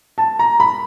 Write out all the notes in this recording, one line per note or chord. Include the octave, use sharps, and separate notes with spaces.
A5
A#5
B5